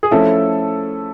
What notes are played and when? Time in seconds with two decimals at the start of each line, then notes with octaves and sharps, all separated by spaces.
0.03 G#4
0.11 F3 A3 C#4 E4 A4